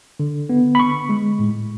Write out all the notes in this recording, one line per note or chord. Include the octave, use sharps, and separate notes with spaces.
D3
B3
B5
D3 C#6
G#3
A2